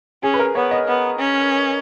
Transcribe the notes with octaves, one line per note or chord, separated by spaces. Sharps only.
C#4 G#4
B4
A#4
B3 C#5
D#5
B3
C#4